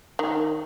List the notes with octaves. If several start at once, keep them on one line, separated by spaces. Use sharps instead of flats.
D#3